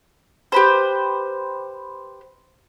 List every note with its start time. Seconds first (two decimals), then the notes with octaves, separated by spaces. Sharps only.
0.52 G4 B4 C5